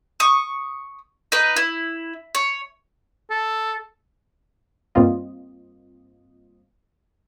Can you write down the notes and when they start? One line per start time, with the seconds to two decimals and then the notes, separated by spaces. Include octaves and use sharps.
0.20 C#6 D#6
1.32 D#4 B4
1.57 E4
2.35 C#5
3.30 A4
4.95 G2 G3 A#3 C4 F4 D#5